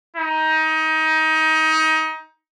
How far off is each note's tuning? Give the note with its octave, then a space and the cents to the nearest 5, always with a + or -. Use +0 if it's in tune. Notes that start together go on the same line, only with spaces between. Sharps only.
D#4 +25